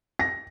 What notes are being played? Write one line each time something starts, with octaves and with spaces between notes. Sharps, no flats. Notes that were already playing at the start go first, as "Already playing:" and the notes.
A#6